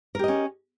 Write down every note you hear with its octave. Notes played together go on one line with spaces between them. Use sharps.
C#4 G4 A#4 D#5